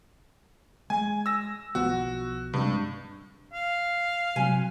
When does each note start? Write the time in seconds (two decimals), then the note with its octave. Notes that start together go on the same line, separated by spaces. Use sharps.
0.90 G#3 G#5
1.26 E6 A#6
1.75 B1 F3 B3 F#4
2.53 G2 C3 G#3 C4
3.53 F5
4.36 C3 F#3 G#5